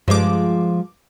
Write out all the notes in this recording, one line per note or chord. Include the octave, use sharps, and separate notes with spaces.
G2 F3 G#3 D6